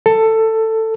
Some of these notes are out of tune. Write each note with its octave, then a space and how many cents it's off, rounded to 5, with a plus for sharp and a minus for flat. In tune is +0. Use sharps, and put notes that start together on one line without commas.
A4 +15